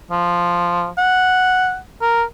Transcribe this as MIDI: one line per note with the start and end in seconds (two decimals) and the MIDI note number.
0.11 0.89 53
0.98 1.77 78
2.01 2.23 70